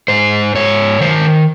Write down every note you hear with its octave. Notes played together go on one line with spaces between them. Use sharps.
G#2 C5
G#2 C#5
D#3 C5